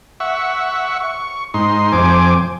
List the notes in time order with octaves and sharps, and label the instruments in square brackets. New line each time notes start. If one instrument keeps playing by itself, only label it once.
[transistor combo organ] E5 F#5 C#6
C#6
G#2 D#4 C6
F2 C5 G#5 D6